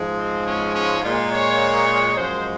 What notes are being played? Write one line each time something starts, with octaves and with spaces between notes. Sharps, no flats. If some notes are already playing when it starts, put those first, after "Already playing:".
Already playing: G#2 F3 G#3
C4
C#4
C#4
A#2 G#3 F4
C#5
F#2 F3 G#3 C5